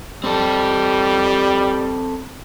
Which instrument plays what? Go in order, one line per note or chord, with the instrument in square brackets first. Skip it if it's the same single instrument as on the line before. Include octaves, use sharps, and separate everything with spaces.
[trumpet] G3 [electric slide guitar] C4 A4